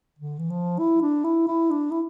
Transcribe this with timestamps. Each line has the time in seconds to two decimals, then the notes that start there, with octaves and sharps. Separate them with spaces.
0.19 D3
0.39 E3
0.50 F3
0.79 E4
1.02 D4
1.24 E4
1.47 E4
1.71 D4
1.91 E4